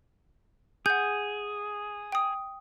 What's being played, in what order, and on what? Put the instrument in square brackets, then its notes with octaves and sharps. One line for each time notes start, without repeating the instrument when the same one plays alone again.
[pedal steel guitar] G#4 [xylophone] F#5 G6
[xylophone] G5 D#6